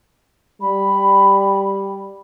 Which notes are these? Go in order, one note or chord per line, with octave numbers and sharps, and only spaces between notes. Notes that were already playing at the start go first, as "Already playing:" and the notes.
G3 B5